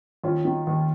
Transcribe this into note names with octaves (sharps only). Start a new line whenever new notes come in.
D#2 C#4 F4
D#3
D#2